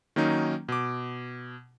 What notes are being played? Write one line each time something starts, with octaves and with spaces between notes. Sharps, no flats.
D#3 F#3 A#3 C#4 D#4
B2 D6